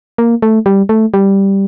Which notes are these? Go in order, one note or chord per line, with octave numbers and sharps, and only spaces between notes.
A#3
A3
G3
A3
G3